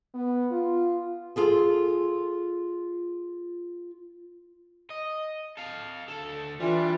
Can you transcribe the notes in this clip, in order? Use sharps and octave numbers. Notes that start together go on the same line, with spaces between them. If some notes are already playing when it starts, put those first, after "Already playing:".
B3
F4
F4 G#4 A4
D#5
A4 F5
D2 A4
E3 G3 D4 F4